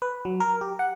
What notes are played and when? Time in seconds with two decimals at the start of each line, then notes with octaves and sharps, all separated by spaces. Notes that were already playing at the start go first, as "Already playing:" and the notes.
0.02 B4
0.25 F#3
0.40 A#4
0.61 G4
0.79 F#5